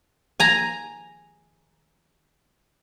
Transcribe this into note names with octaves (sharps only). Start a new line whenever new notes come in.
G#5 A#5